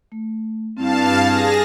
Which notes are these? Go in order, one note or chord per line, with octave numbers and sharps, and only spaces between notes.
A3
G2 C4 E4 F5 A5
G#4 A#6